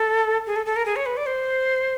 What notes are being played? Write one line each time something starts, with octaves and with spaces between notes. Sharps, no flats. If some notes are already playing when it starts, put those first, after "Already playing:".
Already playing: A4
G#4
A4
A4
A#4
G#4
C#5
B4
D5
C5